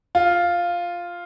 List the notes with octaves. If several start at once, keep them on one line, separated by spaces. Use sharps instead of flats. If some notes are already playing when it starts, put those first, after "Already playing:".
F4